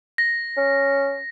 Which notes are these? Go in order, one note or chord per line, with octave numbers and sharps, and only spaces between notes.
A#6
C#4